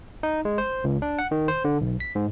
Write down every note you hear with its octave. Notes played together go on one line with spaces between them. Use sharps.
D#4
G#3
C5
C#2
D4
F#5
D#3
C5
D3
B1
B6
G#2